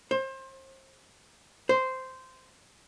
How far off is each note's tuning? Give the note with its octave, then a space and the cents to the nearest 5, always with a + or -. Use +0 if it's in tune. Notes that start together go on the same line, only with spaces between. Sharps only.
C5 +30
C5 -10